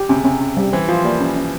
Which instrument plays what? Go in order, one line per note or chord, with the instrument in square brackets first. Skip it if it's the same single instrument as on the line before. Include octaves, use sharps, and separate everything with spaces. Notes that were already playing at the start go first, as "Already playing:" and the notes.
Already playing: [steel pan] G4
[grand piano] C3 [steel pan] C#4
[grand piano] C#3
[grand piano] C3 [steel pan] C#4
[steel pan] C#4
G3
[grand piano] E3 [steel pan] C5
[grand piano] F3 [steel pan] F4
[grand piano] G3 [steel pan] A#3
[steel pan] C#4
C#4